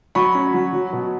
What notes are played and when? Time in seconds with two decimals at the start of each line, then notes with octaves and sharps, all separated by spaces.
0.15 F#3 B5 C#6
0.35 C#4
0.54 F#3
0.73 F#3
0.93 B2